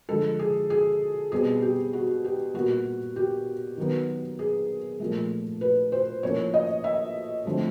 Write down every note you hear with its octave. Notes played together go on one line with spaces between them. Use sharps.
D3 F3 G#3 A4
G#4
G#4
B2 G3 C4 G#4
G4
F#4
G4
A#2 G3 B3 F#4
G4
D#3 F#3 B3
G#4
A#2 F3 A3
B4
C5
A2 F3 A#3 C#4 C#5
D#5
E5
D3 F3 A3 C4